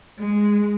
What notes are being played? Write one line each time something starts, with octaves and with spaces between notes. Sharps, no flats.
G#3